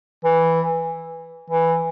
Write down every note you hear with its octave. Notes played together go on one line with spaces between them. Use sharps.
E3
E3